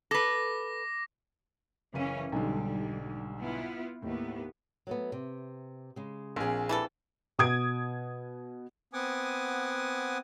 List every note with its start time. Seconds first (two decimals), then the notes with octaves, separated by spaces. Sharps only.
0.11 A4 B4 D6 A#6
1.94 F#1 E3 C#4 F5 D#7
2.32 B1 G#2 D3 G3
3.40 B3 E4 F4
4.02 D#2 A2 B3
4.87 F#3 A3 B3
5.12 C3
5.96 C#3 G#3
6.36 A#1 C4 G#4 F5
6.69 E3 G3 A4
7.39 B2 D#6 G#6 D7
8.93 B3 C4 F#5 G#5 D6 D#6